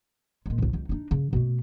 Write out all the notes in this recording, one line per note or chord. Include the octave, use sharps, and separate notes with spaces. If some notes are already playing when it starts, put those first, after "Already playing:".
A#2 G#3
G1 C2
C#2 G3
D4 D#4
C#3
B2 A3